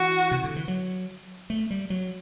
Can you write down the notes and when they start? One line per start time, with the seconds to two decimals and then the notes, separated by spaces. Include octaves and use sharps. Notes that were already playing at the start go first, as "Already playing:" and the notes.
Already playing: E3 F#4
0.31 C3
0.44 D3
0.56 E3
0.68 F#3
1.50 A3
1.70 G3
1.90 F#3